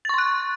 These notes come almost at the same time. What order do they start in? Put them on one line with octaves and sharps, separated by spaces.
A6 C#6 C6 F#6